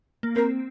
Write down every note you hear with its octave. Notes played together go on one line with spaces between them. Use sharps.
A#3
C4 A#4